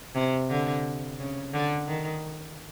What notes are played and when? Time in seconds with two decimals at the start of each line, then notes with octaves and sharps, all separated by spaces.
0.15 C3
0.50 D3
1.19 C#3
1.54 D3
1.87 D#3